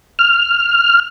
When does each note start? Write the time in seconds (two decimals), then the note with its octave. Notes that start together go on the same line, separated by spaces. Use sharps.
0.19 F6